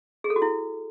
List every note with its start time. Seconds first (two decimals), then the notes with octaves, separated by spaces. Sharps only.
0.24 G#4
0.30 A4
0.36 F#4
0.42 E4